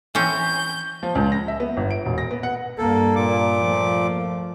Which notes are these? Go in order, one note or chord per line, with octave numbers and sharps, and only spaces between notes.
E3 C4 C#4 G6
F3
C#2
A#6
E5
B3
G1
D7
E1
A#6
B3
F#5
G2 A#3 A4
A#2 D6
F3 A3